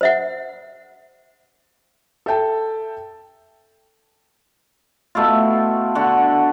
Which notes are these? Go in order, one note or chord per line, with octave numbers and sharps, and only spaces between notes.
C5 E5 F#5
A4 E5 G5 A5
B2 A3 E4 F4
D3 F#4 F#5